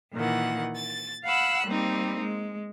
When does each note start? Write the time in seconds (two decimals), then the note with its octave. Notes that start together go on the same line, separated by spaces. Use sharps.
0.14 A#2 D#3 E3 F#5
0.75 A6
1.25 F5 F#5 B5 E6 F#6
1.65 G3 A#3 C4 D#4
2.19 G#3